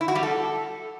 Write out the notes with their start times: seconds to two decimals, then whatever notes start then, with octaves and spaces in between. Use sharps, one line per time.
0.01 E4
0.08 F#4
0.15 G3
0.23 A4